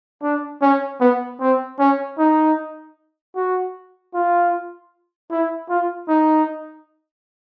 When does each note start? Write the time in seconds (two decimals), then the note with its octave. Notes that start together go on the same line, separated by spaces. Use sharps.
0.23 D4
0.62 C#4
1.00 B3
1.40 C4
1.79 C#4
2.18 D#4
3.35 F#4
4.14 F4
5.31 E4
5.69 F4
6.08 D#4